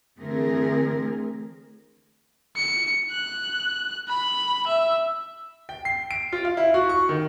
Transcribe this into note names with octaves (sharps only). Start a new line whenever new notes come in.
D3 E3 A3 C4 G#4 A#4
C#7
F#6
B5
E5
G5
C7
D7
F4
F5
E4
F#4
C#6
D#3